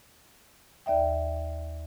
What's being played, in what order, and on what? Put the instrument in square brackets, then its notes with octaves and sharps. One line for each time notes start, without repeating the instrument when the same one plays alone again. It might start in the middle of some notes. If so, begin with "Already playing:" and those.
[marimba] D#2 D5 E5 G5